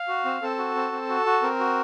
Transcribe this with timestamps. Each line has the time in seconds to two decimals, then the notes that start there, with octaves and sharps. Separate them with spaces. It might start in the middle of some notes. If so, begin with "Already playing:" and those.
Already playing: F5
0.08 F#4
0.25 C4
0.42 C4 A4
0.58 F#4
0.75 C4
0.92 C4
1.09 F#4
1.26 F#4
1.43 C4 A#4
1.59 F#4